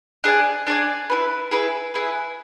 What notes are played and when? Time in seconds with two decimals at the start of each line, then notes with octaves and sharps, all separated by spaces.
0.24 D4 G#4 D5 G#5
0.67 D4 G#4 D5 G#5
1.10 E4 G#4 B4
1.51 E4 G#4 B4
1.94 E4 G#4 B4